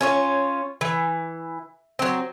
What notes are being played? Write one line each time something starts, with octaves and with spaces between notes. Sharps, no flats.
C#4 F4 C#5
E3
F#3 C4